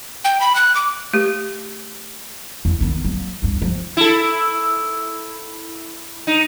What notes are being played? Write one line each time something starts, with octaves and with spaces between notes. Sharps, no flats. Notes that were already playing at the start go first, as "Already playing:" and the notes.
G5
B5
F#6
D6
A3 G4
E2
D#3 B3
F#3 A#3
D2 G2
F3
E4 A4
D#4